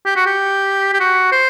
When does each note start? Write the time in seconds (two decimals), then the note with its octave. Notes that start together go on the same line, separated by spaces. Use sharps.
0.05 G4
0.16 F#4
0.26 G4
0.93 G4
1.00 F#4
1.32 C5